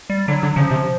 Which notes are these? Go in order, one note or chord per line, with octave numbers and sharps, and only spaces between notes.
G3
D3 F#3
D3
C#3 F3
C3